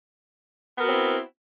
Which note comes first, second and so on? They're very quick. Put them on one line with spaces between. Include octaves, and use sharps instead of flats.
B3 A#4 F#4 C4 E4